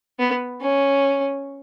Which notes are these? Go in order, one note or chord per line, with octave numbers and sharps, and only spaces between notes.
B3
C#4